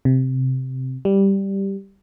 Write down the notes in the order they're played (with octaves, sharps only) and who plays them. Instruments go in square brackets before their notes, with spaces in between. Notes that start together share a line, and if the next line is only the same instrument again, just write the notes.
[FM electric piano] C3
G3